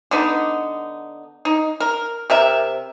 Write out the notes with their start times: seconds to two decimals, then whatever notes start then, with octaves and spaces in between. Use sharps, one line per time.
0.11 D3 B3 D#4
1.45 D#4
1.80 A#4
2.30 C3 A#4 E5